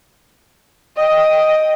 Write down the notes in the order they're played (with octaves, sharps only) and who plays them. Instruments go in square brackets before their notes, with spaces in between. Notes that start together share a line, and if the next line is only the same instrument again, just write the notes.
[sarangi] D#5 [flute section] G5 D#6